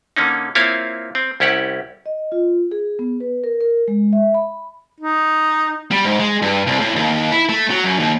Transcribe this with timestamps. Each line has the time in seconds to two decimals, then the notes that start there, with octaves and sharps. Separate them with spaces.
0.16 D3 A#3 C#4 D#4
0.55 A#3 C4 E4 F4 C#5 F5
1.15 C4
1.40 C2 C#4 E4 G4 F#5
2.06 D#5
2.32 F4
2.71 G#4
2.99 B3
3.20 B4
3.44 A#4
3.61 A#4
3.88 G#3
4.13 E5
4.34 B5
5.00 D#4
5.91 G3
6.04 G#2
6.20 G#3
6.42 G2
6.67 C2
6.80 A2
6.96 D#2
7.32 E4
7.49 A3
7.70 F#3
7.84 F#2
7.99 D#2